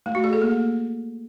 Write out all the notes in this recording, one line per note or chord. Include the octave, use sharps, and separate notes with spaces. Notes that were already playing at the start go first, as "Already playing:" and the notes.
A3
F#4
G#4
A4
A#3